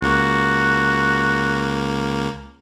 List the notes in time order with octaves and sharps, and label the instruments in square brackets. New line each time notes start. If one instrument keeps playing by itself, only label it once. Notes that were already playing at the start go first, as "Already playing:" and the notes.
[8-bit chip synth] C#2 A#3 [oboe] F#4